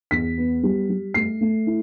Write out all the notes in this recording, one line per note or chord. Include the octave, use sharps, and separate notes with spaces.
E2 B6
B3
G3
G3
A3 C7
A3
E4